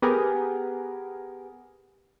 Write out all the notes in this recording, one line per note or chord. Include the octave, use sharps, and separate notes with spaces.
B3 G4 G#4 A#4